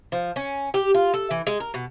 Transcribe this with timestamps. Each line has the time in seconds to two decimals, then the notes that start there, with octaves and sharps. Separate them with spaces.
0.12 F3
0.36 C#4
0.74 G4
0.94 F4
1.14 A4
1.31 E3
1.47 G#3
1.60 A#4
1.74 B2